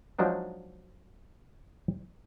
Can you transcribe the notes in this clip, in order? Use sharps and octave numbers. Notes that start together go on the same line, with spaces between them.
F3 F#3 G#3 D4 D#4